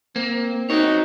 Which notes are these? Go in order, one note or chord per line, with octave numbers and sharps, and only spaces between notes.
A#3 C4
D#4 F#4 A#4 C#5